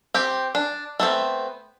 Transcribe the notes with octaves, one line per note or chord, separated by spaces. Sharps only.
C4 G4
D4
A3 B3 C4